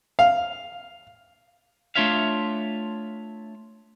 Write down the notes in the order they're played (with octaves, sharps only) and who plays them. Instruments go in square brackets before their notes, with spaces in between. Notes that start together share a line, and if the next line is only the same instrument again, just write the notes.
[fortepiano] F5
[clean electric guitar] A3 D4 F4 C#5 E5 F5